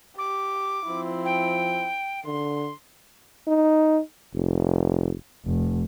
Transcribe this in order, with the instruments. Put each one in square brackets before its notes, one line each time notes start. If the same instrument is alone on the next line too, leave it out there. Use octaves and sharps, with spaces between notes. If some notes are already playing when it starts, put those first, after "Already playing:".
[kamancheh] G4 [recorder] D6
[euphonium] F3 [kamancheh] C4 E4
[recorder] G5
[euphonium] D3 [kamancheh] C6
[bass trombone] D#4
F1
[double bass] F1